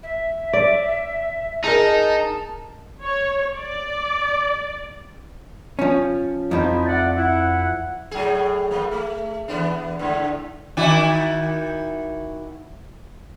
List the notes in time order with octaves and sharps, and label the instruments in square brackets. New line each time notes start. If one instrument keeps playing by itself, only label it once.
[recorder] E5
[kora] D5
[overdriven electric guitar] D#4 [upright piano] G#4 A#4 [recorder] A5
[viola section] C#5
D5
[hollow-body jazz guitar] F3 C#4
[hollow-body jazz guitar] F2 F3 C5 [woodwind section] D#4 E4
[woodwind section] A3 D5 F#5
E4 F#5
[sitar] A2 F#3 G#4
A2 A#3
A3
E3 B3 D4
G#2 D3
D#3 E4 F#4